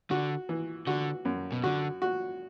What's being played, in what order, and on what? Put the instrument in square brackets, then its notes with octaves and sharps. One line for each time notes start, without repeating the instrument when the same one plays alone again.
[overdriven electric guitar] D3 [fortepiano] F#4
[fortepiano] E3
[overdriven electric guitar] D3 [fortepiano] F#4
[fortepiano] F#2
[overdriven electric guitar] B2
[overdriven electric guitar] D3 [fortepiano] F#4
[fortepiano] F#4